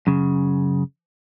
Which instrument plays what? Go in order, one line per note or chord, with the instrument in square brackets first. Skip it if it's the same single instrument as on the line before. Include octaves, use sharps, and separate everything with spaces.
[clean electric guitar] F#2 C#3